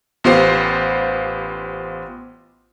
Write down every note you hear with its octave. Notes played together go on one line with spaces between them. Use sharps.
A1 B3 F4 G4 C5